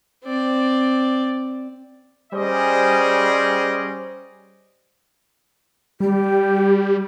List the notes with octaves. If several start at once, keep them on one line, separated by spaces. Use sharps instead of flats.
C4 D5
G3 C#4 G#4 C5 D5 D#5
G3 G4